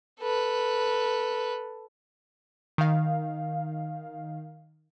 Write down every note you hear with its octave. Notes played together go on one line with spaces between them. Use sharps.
A4 B4
D#3 F5